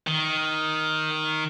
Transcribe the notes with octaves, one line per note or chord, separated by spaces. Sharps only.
D#3